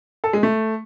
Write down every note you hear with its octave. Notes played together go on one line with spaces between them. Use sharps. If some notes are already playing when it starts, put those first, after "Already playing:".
A4
G#3
A3